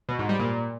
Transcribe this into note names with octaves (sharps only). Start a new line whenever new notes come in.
B2
G#2
G3
A#2